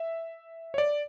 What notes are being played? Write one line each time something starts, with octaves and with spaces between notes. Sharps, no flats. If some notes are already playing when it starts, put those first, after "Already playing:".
Already playing: E5
C#5
D5